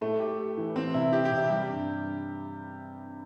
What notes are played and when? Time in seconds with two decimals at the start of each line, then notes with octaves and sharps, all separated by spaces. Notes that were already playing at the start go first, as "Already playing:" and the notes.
0.01 A2 A3
0.19 G4
0.39 G4
0.57 E3
0.75 E3 C4
0.94 C3 E4
1.12 E3 G4
1.25 G4
1.31 C3
1.37 E4
1.49 G3 G4
1.68 G2